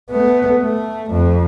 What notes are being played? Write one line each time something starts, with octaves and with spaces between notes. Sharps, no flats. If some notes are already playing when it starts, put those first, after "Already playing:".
A3 B3
A3
F2